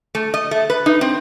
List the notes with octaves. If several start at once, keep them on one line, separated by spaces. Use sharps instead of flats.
A3
D#5
A3
B4
D#4
C4